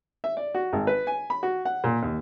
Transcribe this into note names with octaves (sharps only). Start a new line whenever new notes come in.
E5
D5
F#4
G#1
B4
G#5
B5
F#4
F#5
A#2
D#2